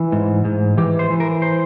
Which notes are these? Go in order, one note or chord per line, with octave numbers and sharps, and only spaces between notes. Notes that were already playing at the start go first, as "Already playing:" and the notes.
Already playing: E3
G#2
G#2
E3 G4
C5
E3
A#4
C5